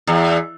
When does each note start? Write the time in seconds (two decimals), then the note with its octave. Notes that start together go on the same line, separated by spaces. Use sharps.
0.07 E2